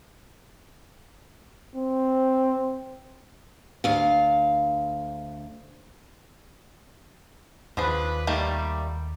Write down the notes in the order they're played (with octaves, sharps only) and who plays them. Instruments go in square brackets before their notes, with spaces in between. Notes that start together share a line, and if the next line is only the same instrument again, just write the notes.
[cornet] C4
[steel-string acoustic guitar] D2 F5
[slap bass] D#2 [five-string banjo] F3 D4 G#4 [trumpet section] B4
[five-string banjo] D#3 A3 A#3 [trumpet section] G3